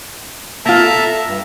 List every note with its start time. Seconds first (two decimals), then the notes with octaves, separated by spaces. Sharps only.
0.66 A#3 F4 E5 A5 A#5
0.80 A4
1.27 G2